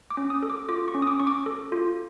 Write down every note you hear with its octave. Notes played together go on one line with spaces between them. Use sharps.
D6
C#4
D#6
A4
D6
F4 D6
C#6
C#4
D#6
D6
C#4 C#6
D6
A4
F4